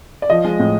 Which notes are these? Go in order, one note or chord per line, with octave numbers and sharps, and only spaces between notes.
D5
F3 D#5
G#3
A2